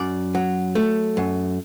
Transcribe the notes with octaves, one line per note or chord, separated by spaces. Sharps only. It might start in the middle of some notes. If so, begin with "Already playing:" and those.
Already playing: F#2 D5
F#3
A3
F#2